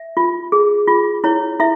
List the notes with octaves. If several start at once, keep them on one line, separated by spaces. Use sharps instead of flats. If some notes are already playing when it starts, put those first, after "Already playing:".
Already playing: E5
F4
G#4
F4
E4 C#5
E4 E5